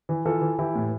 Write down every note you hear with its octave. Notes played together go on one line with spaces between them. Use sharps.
E3
E3 F4 A4
E3
E3 E4 G4
A2